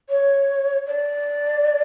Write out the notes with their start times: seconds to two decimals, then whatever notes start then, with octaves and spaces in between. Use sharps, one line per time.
0.09 C#5
0.86 D5